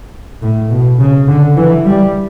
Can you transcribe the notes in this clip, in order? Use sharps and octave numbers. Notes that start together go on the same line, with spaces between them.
A2
B2
C#3
D3
E3
G3